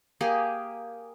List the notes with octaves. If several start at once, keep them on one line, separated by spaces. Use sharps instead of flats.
A#3 G4 G#4 A#4